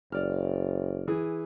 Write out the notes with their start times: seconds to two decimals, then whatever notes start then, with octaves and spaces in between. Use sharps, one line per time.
0.12 F#1 D5 F6
1.08 E3 G#4